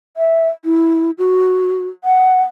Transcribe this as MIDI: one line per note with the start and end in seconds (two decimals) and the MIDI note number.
0.17 0.48 76
0.65 1.11 64
1.18 1.88 66
2.04 2.43 78